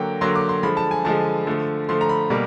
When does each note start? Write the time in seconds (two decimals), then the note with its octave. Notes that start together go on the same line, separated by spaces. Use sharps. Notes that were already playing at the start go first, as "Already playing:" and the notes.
Already playing: D3 F#3 A#3 G5
0.21 D3 F#3 A#3 C6
0.35 D6
0.49 C6
0.63 D3 F3 G#3 B5
0.77 A5
0.91 G#5
1.05 D3 F3 G#3 A5
1.47 D3 F3 A3
1.89 D3 F3 A3 C6
2.01 A#5
2.09 B5
2.30 B2 G3 A#3